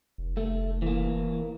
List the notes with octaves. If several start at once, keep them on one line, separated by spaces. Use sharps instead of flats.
F1
A3
E3 A#3